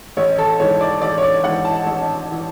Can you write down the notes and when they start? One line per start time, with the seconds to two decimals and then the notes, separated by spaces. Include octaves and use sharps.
0.17 A1 C#5
0.38 A4
0.60 G#2 E3 C#5
0.81 D5
1.02 A1 D5
1.18 C#5
1.23 D5
1.43 G#2 E3 F#5
1.65 A5
1.86 A1
2.32 E3